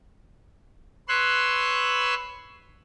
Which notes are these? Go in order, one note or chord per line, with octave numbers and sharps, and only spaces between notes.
B4 C#5 C6 E6 F#6